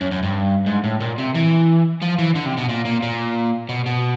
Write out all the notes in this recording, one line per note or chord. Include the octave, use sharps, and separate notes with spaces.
F#2
F#2
G2
G#2
A2
A#2
C3
E3
F3
E3
D3
C3
B2
A#2
A#2
A#2
B2
B2